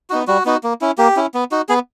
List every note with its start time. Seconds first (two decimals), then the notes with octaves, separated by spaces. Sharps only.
0.10 B3 D#4 F#4
0.27 G3 F#4
0.45 B3 D#4 F#4
0.64 A#3
0.81 C#4 E4
0.98 A#3 G4
1.16 C#4 E4
1.34 B3
1.51 D#4 F#4
1.69 B3 G#4